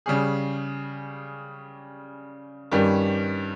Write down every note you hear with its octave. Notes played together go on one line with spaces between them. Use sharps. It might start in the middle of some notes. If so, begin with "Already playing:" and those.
C#3 G3 C#4 G#4
G2 D#3 G3 C#4